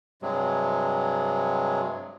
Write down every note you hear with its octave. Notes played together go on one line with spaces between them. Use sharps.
G2 C3 F#3 G#3